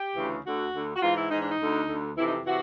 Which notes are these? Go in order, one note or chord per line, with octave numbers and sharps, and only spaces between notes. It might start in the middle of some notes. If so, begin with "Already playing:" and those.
Already playing: G4
D2 C#3 E3
D2 D3 F#4
D2 D3
F#4
G#2 E3 F4
E4
G#2 E3 D#4
D4
D#4
D2 D3
D2 D3
F2 C3 E3 E4
D#4
C3 E3 F#4